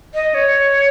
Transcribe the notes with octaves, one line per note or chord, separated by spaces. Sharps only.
D#5
C#5